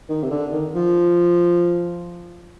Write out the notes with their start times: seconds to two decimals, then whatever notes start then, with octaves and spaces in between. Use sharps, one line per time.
0.09 D#3
0.23 C3
0.30 D3
0.52 D#3
0.74 F3